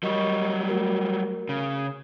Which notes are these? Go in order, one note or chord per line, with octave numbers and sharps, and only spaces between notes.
F#3 G3 A#4 D#5 C#6
A3 F#4 A#4
C#3